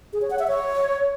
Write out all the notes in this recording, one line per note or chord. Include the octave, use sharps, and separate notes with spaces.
G#4
C#5
F#5
E5
C#5